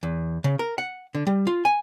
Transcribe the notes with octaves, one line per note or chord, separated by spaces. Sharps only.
E2
C#3
A#4
F#5
D3
G3
F4
G#5